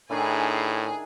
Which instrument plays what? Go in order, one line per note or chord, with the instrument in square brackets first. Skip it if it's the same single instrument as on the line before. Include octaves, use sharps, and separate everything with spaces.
[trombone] A2 [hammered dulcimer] D#3 D4 E4 [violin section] G#4 G#5